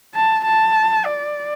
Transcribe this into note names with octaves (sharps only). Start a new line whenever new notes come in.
A5
A5
D5